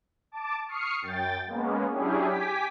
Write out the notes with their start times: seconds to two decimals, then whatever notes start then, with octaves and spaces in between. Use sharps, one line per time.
0.32 A5 D6
0.68 C#6 D#6 F6 C7 C#7
1.02 F#2 G5 A6
1.46 G#3 A#3 B3 C#4
1.90 F#3 C#4 D4 E4 G4 G#4
2.27 G4 G#5 D6 B6